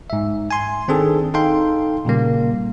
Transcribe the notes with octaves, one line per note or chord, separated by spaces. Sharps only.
G#2 E5
G#5 C6
D#3 C4 D4 G#4 A4
D#4 A4 F5 G5 C6
A#2 C#3 G3 A#3